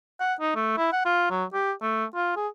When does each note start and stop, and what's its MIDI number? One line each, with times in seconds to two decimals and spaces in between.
0.20 0.34 78
0.40 0.52 63
0.56 0.76 57
0.78 0.89 64
0.93 1.03 78
1.05 1.26 65
1.30 1.45 54
1.54 1.72 67
1.82 2.05 57
2.15 2.35 65
2.36 2.48 68